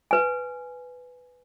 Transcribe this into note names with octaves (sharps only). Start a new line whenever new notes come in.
B4 G#5